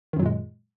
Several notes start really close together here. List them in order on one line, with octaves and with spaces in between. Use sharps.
D#3 F#2 F#3 A#2 G#3